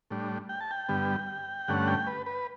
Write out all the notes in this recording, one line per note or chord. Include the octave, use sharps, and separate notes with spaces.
A2 G3 D4
G5
A5
G5
G2 D3 G3 B3
G2 D3 A3 C#4 F#5
G5
B4
B4